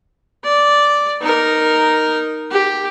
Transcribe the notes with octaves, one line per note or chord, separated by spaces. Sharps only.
D5
D#4 A#4
G4